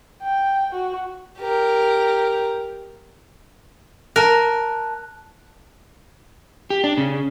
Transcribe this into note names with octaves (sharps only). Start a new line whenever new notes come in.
G5
F#4
G4 A#4
A#4 A5 F#6
G4
D4
C#3